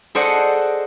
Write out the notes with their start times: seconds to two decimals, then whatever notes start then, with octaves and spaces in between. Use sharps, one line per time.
0.15 G#4 A4 C5 D5 D#5 F#5